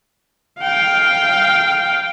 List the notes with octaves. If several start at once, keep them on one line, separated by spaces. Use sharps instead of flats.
F5 G5